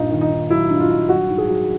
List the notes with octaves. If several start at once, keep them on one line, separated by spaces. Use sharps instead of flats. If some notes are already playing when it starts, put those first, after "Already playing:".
Already playing: G2 A#2 D#4
D#3
D#4
D#3
F#3 E4
G2
F4
G2
F#3 F#4
G#2
G#4
F#3